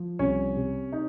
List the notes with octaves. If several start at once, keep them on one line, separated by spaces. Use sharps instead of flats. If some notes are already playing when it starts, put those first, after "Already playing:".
Already playing: F3
C2 C#4 C#5
C3
D#4